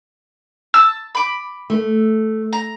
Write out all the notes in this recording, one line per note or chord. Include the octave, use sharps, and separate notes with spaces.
A5 E6
B5 D6
A3
A#5